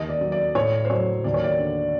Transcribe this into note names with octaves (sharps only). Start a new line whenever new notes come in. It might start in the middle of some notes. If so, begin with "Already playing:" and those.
Already playing: D#2 D#5
D5
F#3
D5
A2 C#5
C5
F#3 C#5
D#2 D5
C#5
D5
D3